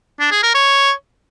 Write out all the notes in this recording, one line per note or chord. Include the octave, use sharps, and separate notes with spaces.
D4
G#4
A#4
C#5